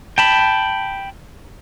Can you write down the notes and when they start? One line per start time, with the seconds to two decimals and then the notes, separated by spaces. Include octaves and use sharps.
0.18 G5 A5 B5